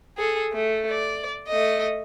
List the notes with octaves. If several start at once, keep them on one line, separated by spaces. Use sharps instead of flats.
G#4 A4
A3
D5
A3 D#5